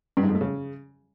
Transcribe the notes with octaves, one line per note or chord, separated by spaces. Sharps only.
G2
G#2
F2
A3
C#3